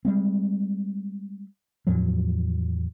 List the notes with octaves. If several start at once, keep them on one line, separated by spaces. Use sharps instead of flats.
G3 G#3 C4
E2 A2 F3 F#3